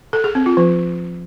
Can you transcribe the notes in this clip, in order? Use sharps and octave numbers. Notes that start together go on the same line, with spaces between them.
A4
G#4
C4
F4
F3